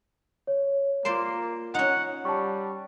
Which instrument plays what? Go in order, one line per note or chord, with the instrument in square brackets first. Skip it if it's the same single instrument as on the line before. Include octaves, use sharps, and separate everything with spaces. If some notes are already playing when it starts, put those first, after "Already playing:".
[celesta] C#5
[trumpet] A#3 [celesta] F4 E7 [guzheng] C5 D5 C6
[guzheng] C#4 D#4 [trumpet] F#5
[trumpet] G3 [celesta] A5 C#6